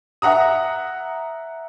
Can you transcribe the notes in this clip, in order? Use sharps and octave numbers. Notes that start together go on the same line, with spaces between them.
E5 F#5 A#5 D#6